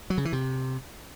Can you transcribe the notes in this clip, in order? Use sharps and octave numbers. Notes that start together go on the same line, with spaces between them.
F#3
C#3
E3
C3